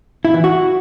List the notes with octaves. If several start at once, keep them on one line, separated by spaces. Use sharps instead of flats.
E4
E3
F#4